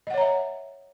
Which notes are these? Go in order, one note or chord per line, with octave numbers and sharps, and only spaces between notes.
C#5 D#5 E5 F#5 A#5